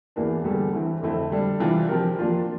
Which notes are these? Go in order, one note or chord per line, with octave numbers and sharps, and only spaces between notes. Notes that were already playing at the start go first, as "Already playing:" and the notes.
E2 E3 A#3 D4
E2 D3 G3
E3 A3 C4
F2 D3 A3 C4 E4
D3 G3 D4
C3 E3 G3 D4 F4
F3 C4 G4 A#4
F3 A#3 D4 F4